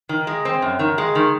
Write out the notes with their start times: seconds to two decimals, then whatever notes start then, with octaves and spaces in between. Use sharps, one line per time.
0.09 D#3
0.27 G#3
0.45 C4
0.62 F#2
0.79 D#3
0.98 G#3
1.15 D#3